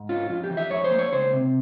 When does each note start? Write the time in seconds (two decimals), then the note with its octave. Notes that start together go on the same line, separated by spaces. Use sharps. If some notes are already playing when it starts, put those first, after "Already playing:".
Already playing: G#2
0.09 C#4 F4
0.29 F2 F4
0.44 G4
0.50 E3
0.57 E5
0.71 F2 C#5
0.84 C5
0.91 A#3
0.99 C#5
1.12 C#2 C5
1.33 C3